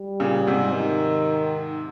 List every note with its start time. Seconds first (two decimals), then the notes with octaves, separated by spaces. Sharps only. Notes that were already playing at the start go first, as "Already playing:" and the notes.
Already playing: G3
0.20 A#2 C#3
0.47 G#2 C3
0.74 D#3